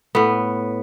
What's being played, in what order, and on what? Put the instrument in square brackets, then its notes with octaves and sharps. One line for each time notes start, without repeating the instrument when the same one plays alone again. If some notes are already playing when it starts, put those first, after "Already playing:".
[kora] A2 B3